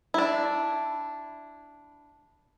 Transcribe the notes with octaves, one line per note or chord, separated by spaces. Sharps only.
D4 E4